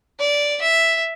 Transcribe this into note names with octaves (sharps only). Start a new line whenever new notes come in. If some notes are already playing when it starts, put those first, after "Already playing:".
D5
E5